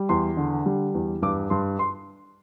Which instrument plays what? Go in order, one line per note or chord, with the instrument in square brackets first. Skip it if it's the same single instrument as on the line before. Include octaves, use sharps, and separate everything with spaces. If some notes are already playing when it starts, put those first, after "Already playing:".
Already playing: [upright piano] G3
E2 C6
D3
G3
E2
G2 D6
G2 C6
C6